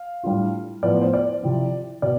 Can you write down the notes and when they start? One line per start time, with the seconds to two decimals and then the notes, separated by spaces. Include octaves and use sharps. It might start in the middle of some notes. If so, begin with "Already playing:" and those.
Already playing: F5
0.23 A2 G3 D4 F4
0.83 A2 F3 B3 D5
1.01 C5
1.13 D5
1.43 C3 F3 C4 E4
2.02 B2 D5